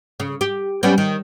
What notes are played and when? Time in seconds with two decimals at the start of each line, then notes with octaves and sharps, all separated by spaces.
0.20 C#3
0.41 G4
0.83 G3 B3 C#4
0.98 D#3